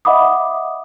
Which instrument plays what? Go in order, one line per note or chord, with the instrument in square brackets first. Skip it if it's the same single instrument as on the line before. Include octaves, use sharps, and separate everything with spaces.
[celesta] D#5 E5 F#5 B5 D6 D#6